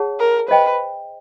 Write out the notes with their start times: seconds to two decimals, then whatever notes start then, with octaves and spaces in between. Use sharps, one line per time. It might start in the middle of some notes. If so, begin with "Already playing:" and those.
Already playing: G#4 C#5 F#5 A5
0.19 A#4
0.48 B4 C5 D#5 G5